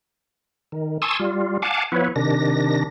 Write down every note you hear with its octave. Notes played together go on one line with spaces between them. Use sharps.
D#3
G#5 A5 C6 C#6 D#6 E6
G3 F4
F5 F#5 G#5 A5 D6
F3 B3 E4 B4 C#5
C3 D#3 D4 A#6